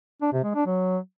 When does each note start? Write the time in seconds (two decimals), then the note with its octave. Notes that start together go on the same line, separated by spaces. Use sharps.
0.22 D4
0.33 C3
0.44 G#3
0.55 D4
0.66 F#3